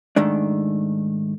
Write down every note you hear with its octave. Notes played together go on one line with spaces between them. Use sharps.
G#2 D#3 A3 D4